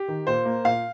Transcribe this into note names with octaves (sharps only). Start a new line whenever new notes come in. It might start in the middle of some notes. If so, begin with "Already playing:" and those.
Already playing: G4
D#3
A#2 C5
A#3
A#2 F5